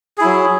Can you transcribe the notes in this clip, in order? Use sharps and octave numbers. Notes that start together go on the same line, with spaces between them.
F#3 E4 G#4